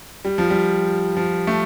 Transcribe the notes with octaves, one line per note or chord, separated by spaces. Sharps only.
G3
F3
G3
F3
A3